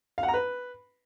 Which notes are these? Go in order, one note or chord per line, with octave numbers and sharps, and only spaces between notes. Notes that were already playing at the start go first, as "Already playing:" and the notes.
F5
F#5
A#5
B4